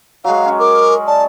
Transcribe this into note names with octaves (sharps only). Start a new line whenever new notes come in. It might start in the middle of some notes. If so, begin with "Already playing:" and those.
F#3 G#3 F5
C#4
A#4 D6
D5 A5